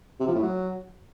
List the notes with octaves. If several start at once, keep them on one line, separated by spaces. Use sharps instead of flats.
C3
F3
A2
F#3